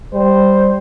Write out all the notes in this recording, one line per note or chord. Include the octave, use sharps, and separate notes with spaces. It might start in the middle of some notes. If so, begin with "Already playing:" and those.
G3 C5